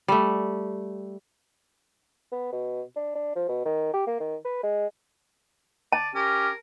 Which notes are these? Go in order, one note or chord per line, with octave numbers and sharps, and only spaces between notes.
G3 A3
B3
B2
D4
D4
F3
B2
D#3
G4
A#3
D#3
B4
G#3
D5 A5
C#4 G4 A#4